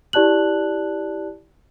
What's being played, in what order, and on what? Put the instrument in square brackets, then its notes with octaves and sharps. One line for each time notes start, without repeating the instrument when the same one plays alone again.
[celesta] E4 G4 D5 A5 F#6 F#7